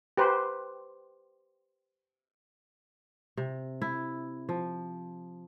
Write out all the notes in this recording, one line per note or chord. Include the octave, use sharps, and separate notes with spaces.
G4 B4 C5
C3
E4
F3